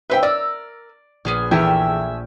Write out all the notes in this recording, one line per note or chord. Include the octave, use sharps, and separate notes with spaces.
G4 B4 C5 E5 G5
A#4 D5 E6
A#1 B3 G#4 F6
E2 E3 A3 G#4 E5 G5 F6